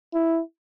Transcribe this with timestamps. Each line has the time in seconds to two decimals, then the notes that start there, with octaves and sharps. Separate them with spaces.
0.14 E4